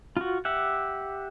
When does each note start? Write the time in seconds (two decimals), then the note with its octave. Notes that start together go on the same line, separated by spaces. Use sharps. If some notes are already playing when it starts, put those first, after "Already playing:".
0.17 F4 F#4
0.45 G4 E5 F#5